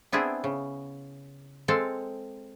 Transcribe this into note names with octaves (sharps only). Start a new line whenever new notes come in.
B3 C4 D4 E4 G#4
C#3
G#3 C4 A4 F5